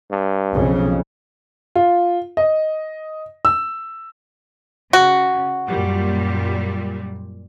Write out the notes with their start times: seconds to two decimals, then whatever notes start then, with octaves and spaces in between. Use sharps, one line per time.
0.11 G2
0.54 B1 F2 C#3
1.76 F4
2.37 D#5
3.45 E6
4.93 C#3 F#4
5.69 F#2 A#2 G3